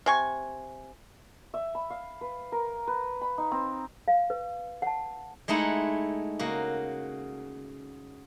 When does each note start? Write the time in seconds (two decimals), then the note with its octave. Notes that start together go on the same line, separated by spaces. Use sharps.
0.06 C3 G#5 C#6
1.54 E5
1.75 B5
1.90 F5
2.21 B4
2.52 A#4
2.87 B4
3.21 B5
3.38 D#4
3.52 C4
4.08 F5
4.30 B4
4.82 F#5 A5
5.48 G#3 A3 D#4 E4 F#5
6.39 C#3 A#3 F#4